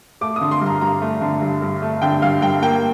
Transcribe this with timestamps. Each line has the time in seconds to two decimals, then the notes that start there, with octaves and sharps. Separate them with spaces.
0.21 A3 D6
0.36 D#6
0.41 D3
0.51 C6
0.61 G2 A#5
0.81 G2 A#5
1.01 A3
1.21 D3
1.42 G2
1.62 G2
1.82 A3
2.02 D3 G5
2.22 G2 F5
2.42 G2 G5
2.62 A#3 G5